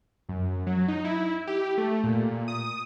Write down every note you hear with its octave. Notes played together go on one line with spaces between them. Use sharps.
F#2
F#3
D#4
E4
G4
A3
A#2
D#6